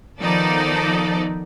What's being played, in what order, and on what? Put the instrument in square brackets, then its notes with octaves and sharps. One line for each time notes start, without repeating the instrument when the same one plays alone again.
[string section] D#3 F3 B3 D#4 A4 D5